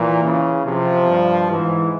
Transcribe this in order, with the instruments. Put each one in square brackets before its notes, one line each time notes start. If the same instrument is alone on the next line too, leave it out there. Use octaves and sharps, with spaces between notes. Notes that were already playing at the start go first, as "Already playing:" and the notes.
Already playing: [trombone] A#2 [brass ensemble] E3
[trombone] C#3
[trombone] C3 [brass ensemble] F3
[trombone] G2
[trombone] G#2 [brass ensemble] E3